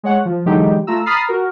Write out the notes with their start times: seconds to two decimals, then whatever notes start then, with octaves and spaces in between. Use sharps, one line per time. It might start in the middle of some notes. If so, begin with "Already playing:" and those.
0.03 G#3 C#5 F#5
0.25 F3
0.46 D3 E3 F#3 G#3 D#4 G4
0.87 A3 F4 A#5 E6
1.06 A#5 B5 D#6 F6 A6 C7
1.29 F#4 A#4